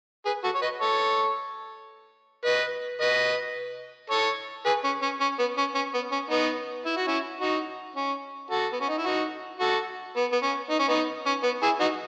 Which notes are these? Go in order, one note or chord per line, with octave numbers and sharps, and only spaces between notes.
G#4 B4
F#4 A4
C#5
B4 D#5
A4 C#5
B4 D#5
B4 D#5
A4 C#5
G#4 B4
C#4
C#4
C#4
B3
C#4
C#4
B3
C#4
B3 D#4
E4
F#4
C#4 E4
D#4 F#4
C#4
F#4 A4
B3
C#4
D#4
E4
D#4 F#4
F#4 A4
B3
B3
C#4
D#4
C#4
B3 D#4
C#4
B3
E4 G#4
D#4 F#4